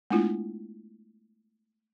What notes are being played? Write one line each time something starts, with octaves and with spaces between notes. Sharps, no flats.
G#3 A3 B3 D4 E4 F4